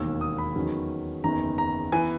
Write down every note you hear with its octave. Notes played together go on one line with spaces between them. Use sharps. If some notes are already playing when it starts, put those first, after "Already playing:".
Already playing: E1 D#2 D#3 A#3 E6
D#6
B5
E2 D#3 F#3 C#4
F#1 E2 D#3 A#5
A#5
E3 B3 G#5